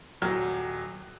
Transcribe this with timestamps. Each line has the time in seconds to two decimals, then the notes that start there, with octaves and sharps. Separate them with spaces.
0.22 D#1 F#3 G4